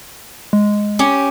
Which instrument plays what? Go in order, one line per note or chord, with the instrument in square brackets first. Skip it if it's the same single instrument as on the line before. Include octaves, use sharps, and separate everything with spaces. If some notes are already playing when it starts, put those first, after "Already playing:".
[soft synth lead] G#3
[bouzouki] C#4 G4